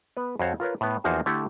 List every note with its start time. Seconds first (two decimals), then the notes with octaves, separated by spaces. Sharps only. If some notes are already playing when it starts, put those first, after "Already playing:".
0.17 B3 B4
0.39 F2 F#4 C5 C#5 F#5 A5
0.60 F4 A#4 B4 C#5
0.81 A2 B3
1.04 E2 F3 A#3 D#4 F#4 C5
1.26 D3 A3 E4 G4 A4